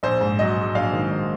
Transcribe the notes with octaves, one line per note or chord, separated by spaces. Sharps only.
A#1 C5
G#2
F#3 D#5
F#3
A#1 F5
D#3
A#1